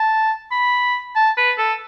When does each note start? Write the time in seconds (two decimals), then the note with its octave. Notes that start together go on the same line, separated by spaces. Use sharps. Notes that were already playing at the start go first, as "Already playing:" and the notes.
Already playing: A5
0.51 B5
1.16 A5
1.37 B4
1.58 A4